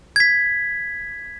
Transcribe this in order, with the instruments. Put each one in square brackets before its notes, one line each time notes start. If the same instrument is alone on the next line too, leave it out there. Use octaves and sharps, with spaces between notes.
[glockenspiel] G#6 B6